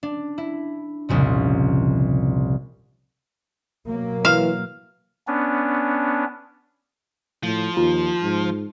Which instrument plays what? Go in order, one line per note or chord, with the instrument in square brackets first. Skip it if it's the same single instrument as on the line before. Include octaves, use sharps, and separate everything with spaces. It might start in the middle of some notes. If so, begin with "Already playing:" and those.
[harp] D4
E4
F1 C2 A#2 C#3
[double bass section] B2 F#3 A#3
[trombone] E3 [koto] F5
[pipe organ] B3 C#4 D4
[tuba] A2 [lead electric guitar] F3
[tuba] D#2 [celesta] F4
[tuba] G#2